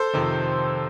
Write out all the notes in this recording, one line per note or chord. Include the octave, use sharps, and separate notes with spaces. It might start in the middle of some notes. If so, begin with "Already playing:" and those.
Already playing: A4 C5
F2 C3 D#3